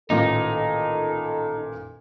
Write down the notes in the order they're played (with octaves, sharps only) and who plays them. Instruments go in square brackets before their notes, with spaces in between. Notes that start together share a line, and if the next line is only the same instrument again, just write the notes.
[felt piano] A1 A#2 D#3 [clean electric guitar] D#4 [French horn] A4